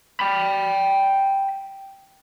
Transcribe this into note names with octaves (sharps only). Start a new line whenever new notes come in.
G5 B5